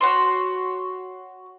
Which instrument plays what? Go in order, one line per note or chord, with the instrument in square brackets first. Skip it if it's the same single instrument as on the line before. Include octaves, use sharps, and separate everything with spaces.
[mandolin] F#4 C#5 C6